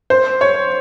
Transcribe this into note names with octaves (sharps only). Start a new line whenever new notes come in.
C5
C#5